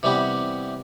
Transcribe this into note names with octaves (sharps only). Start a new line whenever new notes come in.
C3 E3 G3 B3 G4